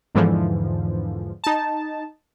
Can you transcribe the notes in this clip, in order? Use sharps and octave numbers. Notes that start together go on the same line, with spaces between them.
E2 G#2 D3 E3 F3
D#4 A5